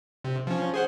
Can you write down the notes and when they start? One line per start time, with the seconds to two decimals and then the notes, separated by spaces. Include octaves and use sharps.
0.24 C3
0.47 F3 C#4
0.74 G#4 C5 F#5